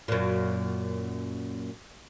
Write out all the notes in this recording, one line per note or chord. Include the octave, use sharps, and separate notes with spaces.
F#2 A#2